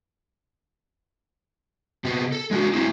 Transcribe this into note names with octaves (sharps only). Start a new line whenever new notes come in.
C3 B3
A4
G#3 D4 F#4
A3 C4 E4